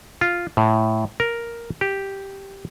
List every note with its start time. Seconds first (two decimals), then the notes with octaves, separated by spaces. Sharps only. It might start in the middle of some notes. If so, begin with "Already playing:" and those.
0.21 F4
0.57 A2
1.20 A#4
1.81 G4